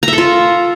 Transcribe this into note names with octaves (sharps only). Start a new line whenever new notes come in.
A#5
E5
A4
F4